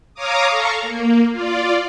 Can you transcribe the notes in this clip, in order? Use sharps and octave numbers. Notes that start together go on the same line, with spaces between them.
C#5 F5 A#5 D6 D#6
A4 F5 A#5 C#6
A#3
F4 D5